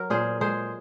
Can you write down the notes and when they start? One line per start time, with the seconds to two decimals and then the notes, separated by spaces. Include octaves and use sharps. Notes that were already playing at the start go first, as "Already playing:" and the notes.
Already playing: F#3 A#4
0.10 A#2 G#4 C5
0.41 G#3 G#4 C5